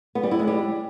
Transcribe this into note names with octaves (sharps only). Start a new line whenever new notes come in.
B3
G3
E4
G#3
G3